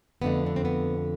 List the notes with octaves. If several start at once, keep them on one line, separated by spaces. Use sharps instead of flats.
F2 D3 A3 B3
D4
C4
B3